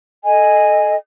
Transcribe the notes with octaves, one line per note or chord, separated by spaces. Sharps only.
A4 D#5 G#5